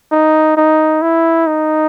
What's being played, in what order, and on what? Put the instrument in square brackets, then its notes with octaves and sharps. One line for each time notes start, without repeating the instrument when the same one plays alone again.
[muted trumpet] D#4
D#4
E4
D#4